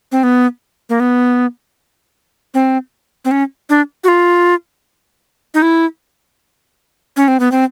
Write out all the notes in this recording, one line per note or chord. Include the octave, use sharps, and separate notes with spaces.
C4
B3
A#3
B3
C4
C4
C#4
D4
F#4
F4
D#4
E4
C#4
C4
B3
C4